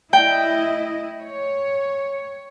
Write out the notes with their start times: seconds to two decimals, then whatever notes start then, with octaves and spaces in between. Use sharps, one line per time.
0.13 A3 E4 D#5 G5
1.22 C#5